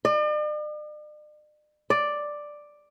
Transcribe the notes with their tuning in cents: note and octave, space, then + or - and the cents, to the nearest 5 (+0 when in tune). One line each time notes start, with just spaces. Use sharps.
D5 +45
D5 +5